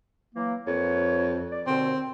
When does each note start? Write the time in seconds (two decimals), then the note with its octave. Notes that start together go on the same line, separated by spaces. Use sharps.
0.35 E3 F#3 A#3
0.67 F2 A#3 B4 C#5
1.52 D5
1.67 D#2 B2 D3 C4